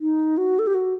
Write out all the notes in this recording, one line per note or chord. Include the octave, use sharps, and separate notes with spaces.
D#4
F#4
A4
G4
F#4